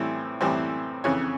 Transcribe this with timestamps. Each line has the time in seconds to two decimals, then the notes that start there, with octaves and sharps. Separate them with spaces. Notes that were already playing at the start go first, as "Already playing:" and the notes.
Already playing: A2 E3 G3 C4
0.41 A2 E3 G3 C4
1.04 F2 C#3 E3 C#5